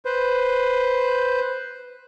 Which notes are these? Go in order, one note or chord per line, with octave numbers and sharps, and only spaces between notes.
B4 C5